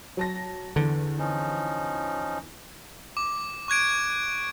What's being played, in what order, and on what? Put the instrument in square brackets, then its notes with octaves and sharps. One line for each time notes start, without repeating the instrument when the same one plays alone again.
[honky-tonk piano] F#3 A5 A#6
[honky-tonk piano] E2 [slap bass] D3
[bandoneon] F3 C#4 D#4
[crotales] D6
C#6 F#6 G#6 D7